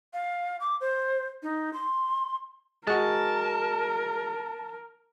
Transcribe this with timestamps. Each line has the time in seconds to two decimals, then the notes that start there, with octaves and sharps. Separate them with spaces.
0.13 F5
0.60 D6
0.81 C5
1.43 D#4
1.73 C6
2.87 G#3 F#4 A#4 A5